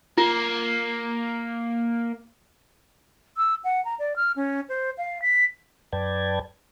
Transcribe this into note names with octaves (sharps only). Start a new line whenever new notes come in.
A#3 F4
E6
F#5
A#5
D5
F6
C#4
C5
F5
B6
F#2 B4 D5 G5 A5 G#6